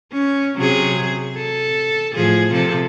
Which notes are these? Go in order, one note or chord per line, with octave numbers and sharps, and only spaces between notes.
C#4
C3 F#3 G#4
A4
A2 F3 G#4
C3 F3 A4